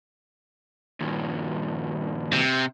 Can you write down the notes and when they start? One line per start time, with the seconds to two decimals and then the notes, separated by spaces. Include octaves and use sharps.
1.00 G2 A#2 D#3
2.33 C3